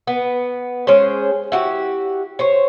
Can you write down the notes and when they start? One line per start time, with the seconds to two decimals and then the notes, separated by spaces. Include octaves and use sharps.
0.07 B3
0.87 G#3 C#4 G#4 C5
1.52 E4 F#4 G4
2.39 C5 C#5